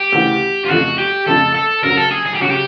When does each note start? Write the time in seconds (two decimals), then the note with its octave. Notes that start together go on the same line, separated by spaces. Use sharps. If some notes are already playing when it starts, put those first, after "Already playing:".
Already playing: G4
0.12 D2 C#3 E3
0.65 F4
0.69 F2 C#3 F3 A3 F#4
0.98 G4
1.26 F2 C#3 F3 A3 A4
1.55 A4
1.83 F#2 C#3 F#3 A#4
1.98 A4
2.11 G#4
2.26 G#4
2.34 G4
2.40 C#3 F#3 F#4
2.50 G4